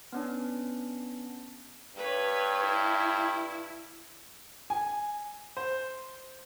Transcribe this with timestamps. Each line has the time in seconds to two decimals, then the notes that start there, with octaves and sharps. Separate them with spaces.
0.12 B3 C#4 D4
1.96 G2 B4 C#5
2.63 E4
4.70 G#5
5.57 C5